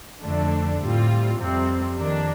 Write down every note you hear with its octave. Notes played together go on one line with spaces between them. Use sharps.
F2 D3 A3 D4
A2 G3 C4 F4
F2 C3 G3 C4
F2 D#3 A#3 D4